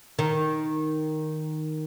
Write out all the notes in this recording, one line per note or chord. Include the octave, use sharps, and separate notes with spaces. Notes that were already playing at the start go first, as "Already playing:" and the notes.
D#3